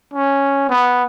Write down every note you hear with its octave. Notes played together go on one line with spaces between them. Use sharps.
C#4
B3